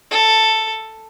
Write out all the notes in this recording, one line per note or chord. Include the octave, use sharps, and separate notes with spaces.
A4